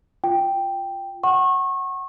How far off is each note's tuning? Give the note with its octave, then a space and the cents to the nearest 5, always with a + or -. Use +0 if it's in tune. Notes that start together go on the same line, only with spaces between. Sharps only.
F4 +0 G5 +0
F#5 +20 C#6 -30